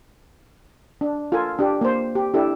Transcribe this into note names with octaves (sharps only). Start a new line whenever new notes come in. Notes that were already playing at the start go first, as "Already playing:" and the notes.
D4
F4 A4 A#4 G#5
D4 G4
A#3 C5
G4
D4 E4 G4 A4